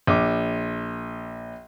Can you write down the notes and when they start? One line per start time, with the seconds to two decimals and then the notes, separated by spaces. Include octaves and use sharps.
0.07 A#1 D6